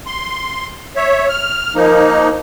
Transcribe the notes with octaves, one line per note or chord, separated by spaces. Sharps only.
C6
C#5 E5
F6
F3 A#3 D#4